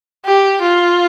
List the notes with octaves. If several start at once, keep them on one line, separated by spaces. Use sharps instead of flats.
G4
F4